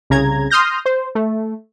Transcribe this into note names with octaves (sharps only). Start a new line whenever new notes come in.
C2 C#3 A#5 G#6
C6 D#6 F6 G6 A#6
C5
A3